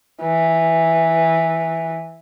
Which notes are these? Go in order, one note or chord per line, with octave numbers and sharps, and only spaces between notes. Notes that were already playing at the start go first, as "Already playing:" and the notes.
E3